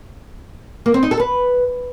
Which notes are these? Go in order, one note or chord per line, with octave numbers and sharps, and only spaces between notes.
A#3
C4
D#4
A4
B4